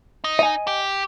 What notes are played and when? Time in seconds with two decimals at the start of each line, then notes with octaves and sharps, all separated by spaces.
0.24 D#4
0.39 D#5 G#5
0.67 G4